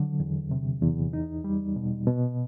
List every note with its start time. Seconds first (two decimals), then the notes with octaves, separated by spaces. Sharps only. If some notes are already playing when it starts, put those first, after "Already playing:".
Already playing: D3 F#3
0.20 E2
0.51 C3
0.82 E2
1.13 D#4
1.44 G3
1.76 B2
2.07 B2